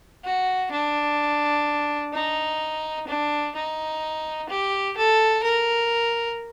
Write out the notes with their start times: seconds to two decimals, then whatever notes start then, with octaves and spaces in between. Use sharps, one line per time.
0.24 F#4
0.72 D4
2.13 D#4
3.07 D4
3.55 D#4
4.49 G4
4.97 A4
5.44 A#4